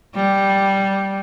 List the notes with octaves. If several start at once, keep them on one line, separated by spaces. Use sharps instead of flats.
G3